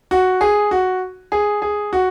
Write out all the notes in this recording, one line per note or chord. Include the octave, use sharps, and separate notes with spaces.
F#4
G#4
F#4
G#4
G#4
F#4